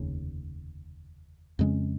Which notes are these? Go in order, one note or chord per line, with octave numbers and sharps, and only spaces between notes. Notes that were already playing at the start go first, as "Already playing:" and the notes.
Already playing: F1 D#2 C#3
F2 C#3 G#3 C#4